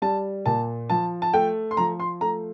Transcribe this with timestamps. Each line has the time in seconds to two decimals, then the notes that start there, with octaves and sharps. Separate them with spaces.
0.02 G3 A5
0.46 A#2 A5
0.90 F3 A5
1.22 A5
1.33 A3 G5
1.71 C6
1.77 F3 A#5
2.00 C6
2.21 A3 A#5